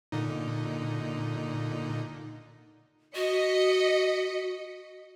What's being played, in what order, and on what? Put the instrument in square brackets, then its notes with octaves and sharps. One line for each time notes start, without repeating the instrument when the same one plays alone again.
[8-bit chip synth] A#2 D3 D#4
[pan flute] F#4 [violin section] D#5 B6 C#7